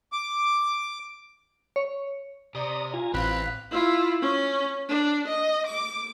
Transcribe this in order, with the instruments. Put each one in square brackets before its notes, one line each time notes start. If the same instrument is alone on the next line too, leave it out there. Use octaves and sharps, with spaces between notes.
[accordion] D6
[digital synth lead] C#5
[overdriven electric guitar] C3 [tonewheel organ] D5 A#5 D#6
[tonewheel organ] F4 G#5 A#5
[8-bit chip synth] A1 [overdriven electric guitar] C4 [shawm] B4 [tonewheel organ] F5
[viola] E4 F4
C#4
D4
D#5
D6